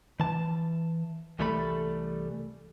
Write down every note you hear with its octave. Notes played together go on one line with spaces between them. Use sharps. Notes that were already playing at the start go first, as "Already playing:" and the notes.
E3 A5
C2 E3 G3 A3 A4 B5